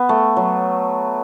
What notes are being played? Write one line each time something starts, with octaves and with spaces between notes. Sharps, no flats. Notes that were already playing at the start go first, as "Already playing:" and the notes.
Already playing: B3
A3
F#3